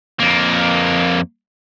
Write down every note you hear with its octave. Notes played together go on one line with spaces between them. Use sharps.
F2 A#3